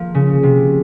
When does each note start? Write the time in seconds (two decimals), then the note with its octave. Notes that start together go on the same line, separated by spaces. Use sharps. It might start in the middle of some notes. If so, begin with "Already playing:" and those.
Already playing: F3 A#3
0.14 C#3
0.43 C3